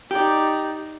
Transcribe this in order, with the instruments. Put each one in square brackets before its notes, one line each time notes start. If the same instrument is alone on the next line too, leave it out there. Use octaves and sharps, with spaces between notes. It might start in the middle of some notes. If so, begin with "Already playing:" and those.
[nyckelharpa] D#4 D5 [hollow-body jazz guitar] G4